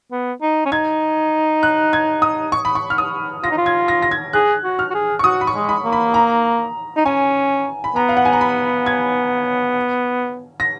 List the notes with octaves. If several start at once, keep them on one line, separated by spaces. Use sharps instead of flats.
B3
D#4
C#4
D#4 G#6
F#6
G#6
D#6
C#6
B5
C#6
F6
D#6
F4 A#6
D#4
F4
G#6
A#6
A#6
G#6
G#4 F#6
F#4
F6
F#4
G#4
C#6
F#4 D#6
B5
C#6
G#3
B5
A#3
B5
A#5
D#4
C#4 G#5
B5
B3 A#5
F5
F#5
G#5
A#5
B5
G#6
A#6